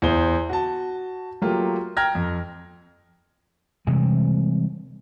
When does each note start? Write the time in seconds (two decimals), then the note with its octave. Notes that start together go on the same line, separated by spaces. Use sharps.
0.02 E2 E3 C5 G7
0.49 F#4 A5
1.42 F#3 A3 A#3 F4 G4
1.97 G5 A#5 F6 G#6 A#6
2.15 F2
3.87 C3 E3 G3 G#3